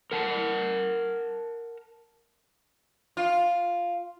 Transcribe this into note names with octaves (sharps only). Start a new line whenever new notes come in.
A#4 F#5 A5
F4